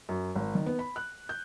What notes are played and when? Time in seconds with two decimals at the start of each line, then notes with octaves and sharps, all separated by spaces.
0.09 F#2
0.35 G#1
0.55 D#3
0.66 B3
0.79 B5
0.96 F#6
1.29 G6